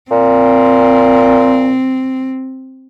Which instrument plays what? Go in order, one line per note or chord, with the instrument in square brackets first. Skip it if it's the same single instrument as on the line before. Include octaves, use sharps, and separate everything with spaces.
[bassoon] A#2 [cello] C4